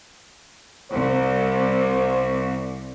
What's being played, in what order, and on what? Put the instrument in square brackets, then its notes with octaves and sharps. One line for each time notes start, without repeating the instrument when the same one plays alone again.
[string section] C2 C3 [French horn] C5